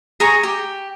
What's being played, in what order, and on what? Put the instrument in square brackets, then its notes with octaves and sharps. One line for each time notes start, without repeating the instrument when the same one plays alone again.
[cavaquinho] G#4 A#5 C#6
G4